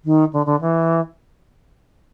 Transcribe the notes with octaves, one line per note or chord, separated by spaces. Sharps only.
D#3
D3
D3
E3